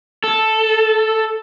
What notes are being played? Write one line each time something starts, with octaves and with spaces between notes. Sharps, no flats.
A4